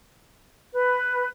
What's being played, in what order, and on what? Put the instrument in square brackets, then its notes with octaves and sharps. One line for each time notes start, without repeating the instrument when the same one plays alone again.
[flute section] B4